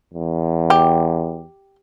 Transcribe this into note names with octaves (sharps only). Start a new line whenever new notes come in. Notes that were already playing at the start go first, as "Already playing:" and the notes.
E2
G4